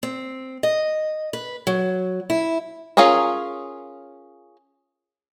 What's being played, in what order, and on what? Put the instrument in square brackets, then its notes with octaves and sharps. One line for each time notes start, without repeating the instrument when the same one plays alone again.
[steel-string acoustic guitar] C4
D#5
B4
F#3
E4
[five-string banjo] C#4 F4 G#4 A#4 C#5